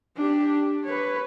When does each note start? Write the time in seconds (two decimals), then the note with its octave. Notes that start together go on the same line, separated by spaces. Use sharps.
0.17 D4 G4
0.84 B4 C#5